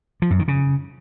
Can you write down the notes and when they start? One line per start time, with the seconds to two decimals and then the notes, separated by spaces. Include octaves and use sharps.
0.22 F3
0.31 F#2
0.39 D#3
0.48 C#3